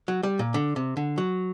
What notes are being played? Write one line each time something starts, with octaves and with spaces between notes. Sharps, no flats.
F#3
G3
A#2
D3
C3
D3
F#3